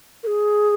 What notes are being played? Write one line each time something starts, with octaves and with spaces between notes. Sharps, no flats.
A#4
G#4